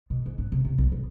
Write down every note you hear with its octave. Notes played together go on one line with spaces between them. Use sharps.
B2
G#2
D4
C3
C3
B1
B1